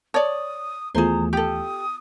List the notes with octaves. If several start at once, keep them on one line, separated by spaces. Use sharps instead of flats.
C#5 D5 A5 D#6
D#2 E3 A3 B3 F4 G#4 C5 A#5
G4 A4 D#6